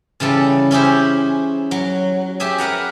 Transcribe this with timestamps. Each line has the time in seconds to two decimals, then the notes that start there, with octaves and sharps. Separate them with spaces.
0.20 C#3 E3 G3 A4
0.71 C#4 E4 G4 G#4 C5
1.71 F#3
2.40 G4 G#4 E5 G#5
2.58 A#4 B4 F#5 A#5